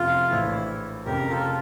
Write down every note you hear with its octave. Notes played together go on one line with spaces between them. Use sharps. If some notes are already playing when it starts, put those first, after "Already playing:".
Already playing: F1 F2 C#3 F3 A3 F4
A#1 A2 E3 E4
F1 F2 C#3 G4 A#4
F4 A4